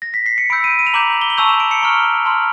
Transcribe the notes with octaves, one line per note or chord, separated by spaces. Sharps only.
A#6
B6
C7
C#7
B5 E6 G6 D7
D#7
D#7
F7
A#5 D6 G6 F#7
G7
F#7
A5 C#6 E6 G6 F7
E7
D7
C#7
A#5 C#6 F6
A5 C6 F6